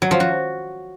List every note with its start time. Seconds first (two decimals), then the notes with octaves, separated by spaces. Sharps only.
0.02 F#3
0.11 F3
0.20 F#4